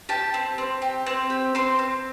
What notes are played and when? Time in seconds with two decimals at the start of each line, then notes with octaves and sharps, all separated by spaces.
0.09 G4 A5
0.34 C4
0.58 C4
0.82 G4
1.06 C4
1.30 G4
1.55 C4 C6
1.79 C4